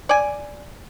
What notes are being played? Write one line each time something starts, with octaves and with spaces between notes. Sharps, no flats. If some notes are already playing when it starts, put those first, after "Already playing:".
D5 G#5